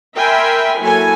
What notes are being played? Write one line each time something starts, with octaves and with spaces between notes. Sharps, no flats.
A#4 E5 G5 G#5 B5 C6
F#3 A#3 E4 A4 G#5